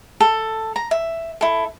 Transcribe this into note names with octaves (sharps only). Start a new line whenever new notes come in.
A4
A#5
E5
E4 A4